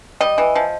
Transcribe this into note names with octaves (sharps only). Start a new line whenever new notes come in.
G3 D#5
E3
F3